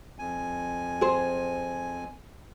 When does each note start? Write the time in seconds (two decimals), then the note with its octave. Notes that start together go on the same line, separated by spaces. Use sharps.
0.19 F2 G#5
1.01 G#4 C5